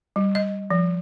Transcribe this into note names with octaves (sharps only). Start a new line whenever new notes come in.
G3
D#5
F3